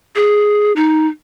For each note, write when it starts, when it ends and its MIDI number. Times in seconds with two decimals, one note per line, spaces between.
0.15 0.72 68
0.76 1.07 63